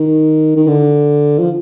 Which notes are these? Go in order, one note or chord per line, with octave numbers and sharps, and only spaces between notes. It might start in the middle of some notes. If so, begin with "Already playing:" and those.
Already playing: D#3
D#3
D3
F3